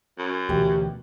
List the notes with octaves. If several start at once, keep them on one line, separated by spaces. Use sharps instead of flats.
F#2
D2 B2 E3 G4